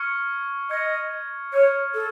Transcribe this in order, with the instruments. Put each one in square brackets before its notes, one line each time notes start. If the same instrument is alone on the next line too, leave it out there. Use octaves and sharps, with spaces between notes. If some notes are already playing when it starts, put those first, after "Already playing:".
Already playing: [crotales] C#6 F6 G#6 C#7
[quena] D#5 [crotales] C#6 F6 G#6 C#7
[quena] C#5 [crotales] C#6 F6 G#6 C#7
[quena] A4